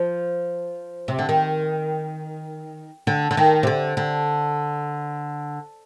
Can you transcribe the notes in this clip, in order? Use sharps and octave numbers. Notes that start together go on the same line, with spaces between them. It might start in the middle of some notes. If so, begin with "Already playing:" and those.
Already playing: F3
C3
D3
D#3
D3
D3
D#3
C3
D3
D3